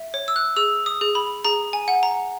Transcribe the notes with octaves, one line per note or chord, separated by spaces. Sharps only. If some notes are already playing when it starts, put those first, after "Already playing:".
Already playing: E5
C#5
E6
F#6
G#4 E6
D#6
G#4
B5
G#4 A#5
G#5
F#5
A#5